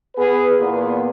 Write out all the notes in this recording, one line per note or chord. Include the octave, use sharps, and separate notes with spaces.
B3 G#4 B4
E2 A#2 B3